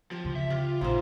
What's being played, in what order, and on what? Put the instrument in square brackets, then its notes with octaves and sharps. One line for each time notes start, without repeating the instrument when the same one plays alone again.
[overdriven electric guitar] F3 [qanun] G4
[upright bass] C#3 E3
[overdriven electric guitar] E5
[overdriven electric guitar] F4 [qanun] G4
[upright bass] A#1 [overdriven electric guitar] G#2 [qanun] F4 C5